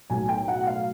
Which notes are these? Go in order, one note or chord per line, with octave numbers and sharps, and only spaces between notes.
B1 A2 F#3 G#5
G5
F#5
F5